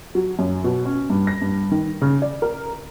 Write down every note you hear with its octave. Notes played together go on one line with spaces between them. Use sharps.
F#3
F#2
B2
C#4
G2
A#6
G2
D#3
C#3
D5
A#4